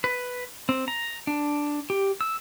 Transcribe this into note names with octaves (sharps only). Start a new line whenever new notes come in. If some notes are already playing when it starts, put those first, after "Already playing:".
B4
C4
A#5
D4
G4
E6